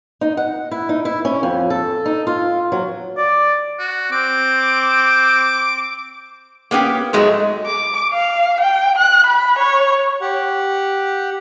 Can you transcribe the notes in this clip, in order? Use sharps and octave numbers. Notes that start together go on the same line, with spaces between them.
D#4
F#5
E4
D#4
E4
C#4
F2
A4
D#4
F4
F#3
D5
F#4
C4 D6
A#3 B3 C#4 F#4 G4
G#2 F#3 G#3 A3
D6
F5
G5
F#6
B5
C#5
G4 F#5